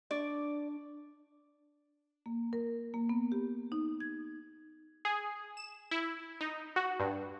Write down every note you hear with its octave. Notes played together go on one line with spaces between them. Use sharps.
D4 D5 C#6 D6
A#3
A#4
A#3
B3
G4
D#4
G#6
G#4
E7
E4
D#4
F#4
G2